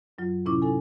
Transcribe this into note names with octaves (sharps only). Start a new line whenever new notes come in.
F#2 F#3 F4
A2 C3 C#4 E4 C#6 D6
D#4 A4 G#5